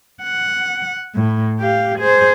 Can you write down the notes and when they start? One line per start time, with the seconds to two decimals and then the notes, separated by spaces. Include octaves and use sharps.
0.23 F#5
1.15 A2
1.60 G4 F5
1.99 G#4 C5